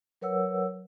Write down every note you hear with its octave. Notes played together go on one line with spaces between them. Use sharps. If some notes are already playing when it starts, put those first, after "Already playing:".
F#3 A#4 B4 C#5 F#5 E6